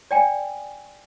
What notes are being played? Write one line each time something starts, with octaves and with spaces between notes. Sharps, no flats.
D5 G5 G#5